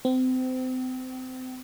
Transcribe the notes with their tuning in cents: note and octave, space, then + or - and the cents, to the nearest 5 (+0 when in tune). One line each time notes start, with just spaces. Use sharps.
C4 -30